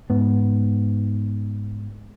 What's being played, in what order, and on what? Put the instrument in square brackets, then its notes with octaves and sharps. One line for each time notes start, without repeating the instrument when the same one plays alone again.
[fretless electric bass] G#2 B3